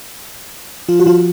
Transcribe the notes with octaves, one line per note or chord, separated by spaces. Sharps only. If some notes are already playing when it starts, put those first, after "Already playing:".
F3 F4
F#4
F3 F4